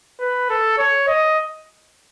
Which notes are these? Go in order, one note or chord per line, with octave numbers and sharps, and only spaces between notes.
B4
A4
C#5
D#5